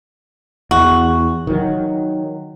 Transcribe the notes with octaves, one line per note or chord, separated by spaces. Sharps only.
E2 F#4
D#3 F#3